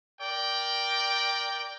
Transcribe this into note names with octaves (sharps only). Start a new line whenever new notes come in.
A#4 D5 G5